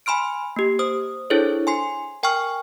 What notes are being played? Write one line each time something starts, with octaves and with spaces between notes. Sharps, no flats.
G#5 B5 C6 F6 D7
A#3 G4
C5 D#6
D4 E4 G#4 A4 C5 C#5
G#5 C6 C7
A#4 G5 G#5 C#6 F6